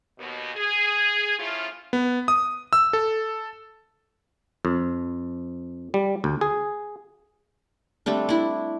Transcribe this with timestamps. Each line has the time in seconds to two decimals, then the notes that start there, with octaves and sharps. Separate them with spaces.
0.19 D#2 B2
0.56 G#4
1.39 F3 A3 C#4 E4 F4
1.93 B3
2.28 D#6
2.73 E6
2.93 A4
4.65 F2
5.94 G3
6.24 D2
6.41 G#4
8.06 G3 A3 C4 D4
8.29 D4 E4